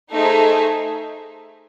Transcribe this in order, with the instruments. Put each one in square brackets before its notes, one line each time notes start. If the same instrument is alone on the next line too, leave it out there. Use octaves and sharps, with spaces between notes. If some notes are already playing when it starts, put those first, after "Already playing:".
[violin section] A3 D#4 G#4 C5 E5